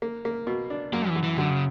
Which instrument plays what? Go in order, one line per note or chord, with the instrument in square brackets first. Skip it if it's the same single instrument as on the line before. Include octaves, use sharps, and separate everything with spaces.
[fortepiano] A#3
A#3
B2
D4
[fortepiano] F#2 [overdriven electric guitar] A#3
[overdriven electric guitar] E3
[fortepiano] F#2
[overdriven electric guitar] E3
[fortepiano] F#2 [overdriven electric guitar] D3
[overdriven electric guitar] C#3